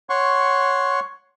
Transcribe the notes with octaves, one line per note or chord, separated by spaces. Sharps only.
C#5 F#5 C6 C#6